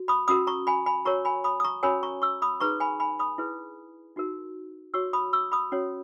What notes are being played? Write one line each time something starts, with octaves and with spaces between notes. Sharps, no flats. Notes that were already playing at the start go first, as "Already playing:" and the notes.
Already playing: F#4
B5 D#6
C#4 F#4 A#4 B5 D#6
A#5 C#6
G#5 B5
G#5 B5
F#4 A#4 C#5 A#5 C#6
G#5 B5
B5 D#6
D#6
A#5 C#6
C#4 F#4 A#4 C#5 G#5 B5
A#5 C#6
C#6 E6
B5 D#6
D#4 G#4 B4 A#5 C#6
G#5 B5
G#5 B5
B5 D#6
E4 G#4 B4
D#4 F#4 A#4
F#4 C#5 C#6 E6
B5 D#6
C#6 E6
B5 D#6
C#4 F#4 C#5